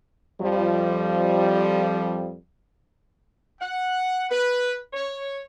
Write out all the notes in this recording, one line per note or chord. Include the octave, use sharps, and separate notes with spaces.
F2 F3 G3
F#5
B4
C#5